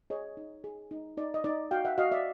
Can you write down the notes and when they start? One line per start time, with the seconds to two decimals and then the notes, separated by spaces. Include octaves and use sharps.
0.10 G#4 C#5 D#5
0.37 D#4
0.64 G#4
0.91 D#4
1.17 D#4 D5
1.34 D#5
1.44 D#4 D5
1.71 F#4 F5 G5
1.85 E5 F#5
1.98 F#4 D#5 F5
2.12 D5 E5